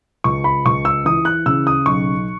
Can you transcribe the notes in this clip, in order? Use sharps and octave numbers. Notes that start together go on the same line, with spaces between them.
C#2 C#6
B5
C#2 C#6
E6
E3 D#6
F#6
C#3 E6
D#6
B1 C#6